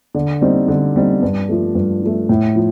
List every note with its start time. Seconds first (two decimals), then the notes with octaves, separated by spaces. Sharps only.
0.15 D3
0.41 G3 C4 D#4
0.68 D3
0.96 G3 C4 D#4
1.22 G2
1.49 F3 A3
1.75 G2
2.03 F3 A3
2.29 A2
2.56 F3